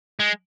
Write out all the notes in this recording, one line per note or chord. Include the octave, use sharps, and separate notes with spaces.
G#3